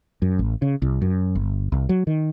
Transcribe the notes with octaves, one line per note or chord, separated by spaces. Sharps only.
F#2
A1
C#3
C2
F#2
G1
C2
F#3
D#3